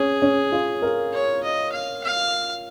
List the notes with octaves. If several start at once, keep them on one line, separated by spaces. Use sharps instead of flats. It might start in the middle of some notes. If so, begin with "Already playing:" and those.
Already playing: C#4 G#4
C#4
F4
A#4
C#5
D#5
F5
F5